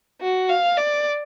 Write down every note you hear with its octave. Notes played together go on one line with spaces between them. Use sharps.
F#4
F5
D5